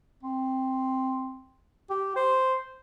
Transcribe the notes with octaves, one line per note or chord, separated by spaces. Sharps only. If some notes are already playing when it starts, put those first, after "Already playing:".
C4
G4
C5